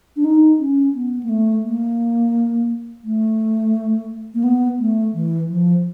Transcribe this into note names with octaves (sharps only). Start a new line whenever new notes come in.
D4
D#4
C#4
B3
A#3
A3
A#3
A3
A#3
B3
A3
E3
F3